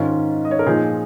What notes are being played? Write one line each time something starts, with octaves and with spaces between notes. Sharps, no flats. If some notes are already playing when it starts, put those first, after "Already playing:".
Already playing: G#2 D#3 C#4 F4
D#5
C#5
A#4
A#2 F3 D#4 G#4